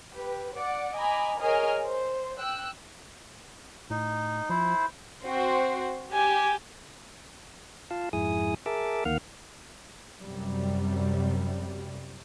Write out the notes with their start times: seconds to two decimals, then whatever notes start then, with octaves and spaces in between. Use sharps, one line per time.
0.15 G4 B4
0.55 D5 F#5 D6
0.96 D#5 G#5 A#5 B5 D6
1.40 G#4 A#4 C#5 D#5 G#5 F6
1.84 C5
2.39 G5 E6 F#6
3.90 A2 D#4
4.50 F3 E4 C5
5.24 C4 F#4 C5
6.13 G4 G#5
7.91 F4 F5 A5
8.13 F2 G#2 E4 G#4 G#5 D#6
8.66 G#4 A#4 E5 A5 D6
9.05 D2 D#3 A#3 F5 F#5 F6
10.22 F#2 C3 G3